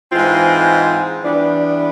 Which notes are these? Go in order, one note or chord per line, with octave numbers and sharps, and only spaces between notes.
G#2 E3 G#3 C4 F4
E3 G3 B3 D4